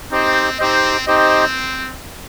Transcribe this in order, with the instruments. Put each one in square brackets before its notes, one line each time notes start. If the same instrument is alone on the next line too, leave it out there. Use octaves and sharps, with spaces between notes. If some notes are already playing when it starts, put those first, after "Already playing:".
[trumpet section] C4 [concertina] D#4 G4 C5 D#5
[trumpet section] C4 [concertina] D#4 G4 C5 D#5
[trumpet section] C4 [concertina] D#4 G4 C5 D#5